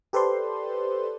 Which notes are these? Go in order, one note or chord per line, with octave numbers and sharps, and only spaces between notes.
G4 A4 B4 C5 D5 C6